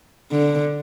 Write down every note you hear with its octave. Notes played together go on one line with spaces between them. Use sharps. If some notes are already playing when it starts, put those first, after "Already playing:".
D3